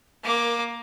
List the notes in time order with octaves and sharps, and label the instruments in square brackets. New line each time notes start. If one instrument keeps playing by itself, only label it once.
[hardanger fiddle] A#3 D6